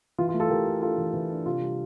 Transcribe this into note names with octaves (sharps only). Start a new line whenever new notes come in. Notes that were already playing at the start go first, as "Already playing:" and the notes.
E3 F4
F4
A3
F4 A4
E3 G4 A#4
A3
D4 F4 A4
E3
E3
D4
C3 F4
G3